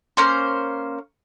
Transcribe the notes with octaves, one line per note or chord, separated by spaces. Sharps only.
A#3 C#4 C5